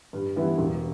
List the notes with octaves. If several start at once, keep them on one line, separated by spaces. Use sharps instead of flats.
G2
E3 G3 B3 E4
E1